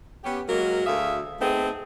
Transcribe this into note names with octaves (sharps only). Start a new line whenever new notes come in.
B3 C#4 G4
F#3 G#3 A#3 A#4
D2 G#4 E5 F5
A3 B3 C4 D#4 G#4